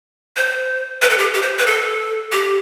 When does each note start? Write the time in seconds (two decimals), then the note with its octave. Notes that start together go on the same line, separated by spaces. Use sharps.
0.37 C5
1.02 B4
1.10 A4
1.18 G4
1.34 G4
1.42 C5
1.59 B4
1.67 A4
2.32 G4